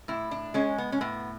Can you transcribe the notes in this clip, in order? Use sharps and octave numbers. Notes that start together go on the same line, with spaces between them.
A2 E4
D4
G#3 C#4
B3
C#4
A2 B3